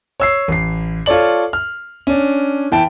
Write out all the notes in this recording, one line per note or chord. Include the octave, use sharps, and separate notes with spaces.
C#5 E6 C7
A1 C7
F4 A4 C#5 D5 F#7
F6
C#4 D4
E3 G5 A5